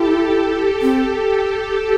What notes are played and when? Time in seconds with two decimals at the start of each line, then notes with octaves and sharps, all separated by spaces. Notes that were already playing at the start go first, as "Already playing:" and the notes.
Already playing: E4 G4 A4
0.23 G4
0.52 A4
0.82 C4